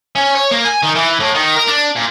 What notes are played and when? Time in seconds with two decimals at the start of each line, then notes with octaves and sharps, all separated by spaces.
0.15 C#4
0.35 C#5
0.51 A#3
0.66 G#5
0.83 D#3
0.96 E3
1.20 A2
1.34 D#3
1.55 A#4
1.67 D4
1.96 A#2